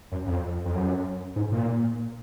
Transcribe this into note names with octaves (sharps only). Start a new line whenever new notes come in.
F#2
F2
F2
F#2
G#2
A#2